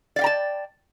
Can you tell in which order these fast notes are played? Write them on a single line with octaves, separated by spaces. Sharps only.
D5 F5 G5 A#5 A5